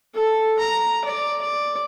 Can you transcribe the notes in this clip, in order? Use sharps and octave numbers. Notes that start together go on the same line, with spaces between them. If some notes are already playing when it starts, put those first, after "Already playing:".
A4
A#5
D5
D5